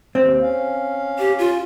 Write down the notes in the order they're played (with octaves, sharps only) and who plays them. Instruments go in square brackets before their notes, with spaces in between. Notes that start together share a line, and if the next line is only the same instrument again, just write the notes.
[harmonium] D#2 [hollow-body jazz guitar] C4
[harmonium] C#4 F5
[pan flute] G4
F4